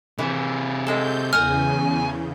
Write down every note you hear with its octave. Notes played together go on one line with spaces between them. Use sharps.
C3 E3 E4 G#4
F#3 G#3 A4 G6
E2 C#3 A#4 F#5 G#5 A#5 F6